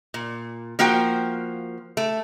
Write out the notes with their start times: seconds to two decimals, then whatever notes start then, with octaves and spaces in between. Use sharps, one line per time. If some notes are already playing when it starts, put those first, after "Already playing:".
0.14 A#2
0.79 F3 A#3 F#4 C5 G5
1.97 A3